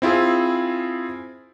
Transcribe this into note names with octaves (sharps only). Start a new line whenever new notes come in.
C4 E4 F4 G#4